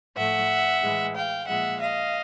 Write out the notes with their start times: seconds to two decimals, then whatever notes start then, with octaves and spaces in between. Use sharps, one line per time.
0.17 A2 F3 A3 E5 F#5
0.82 A2 E3 G#3
1.15 F5 G5
1.48 A#2 F3 G#3 E5 F#5
1.81 D#5 F5